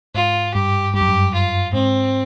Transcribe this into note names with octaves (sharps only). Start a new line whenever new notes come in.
G#2 F4
G2 G4
G2 G4
F#2
G2
F4
G#2 C4